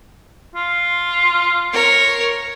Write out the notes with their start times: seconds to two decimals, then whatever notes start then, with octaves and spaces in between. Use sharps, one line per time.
0.56 F4
1.73 A#4 C#5